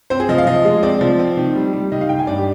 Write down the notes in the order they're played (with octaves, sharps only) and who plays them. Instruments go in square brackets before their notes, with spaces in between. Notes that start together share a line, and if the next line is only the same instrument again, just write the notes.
[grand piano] C4 C5
G#4
F3 D#5
F5
F3 D#5
G#3
C4 D5
F3
C4
D#3
G3
G3
D#3 D#5
F5
D#3 G5
G#5
G2 D5
G4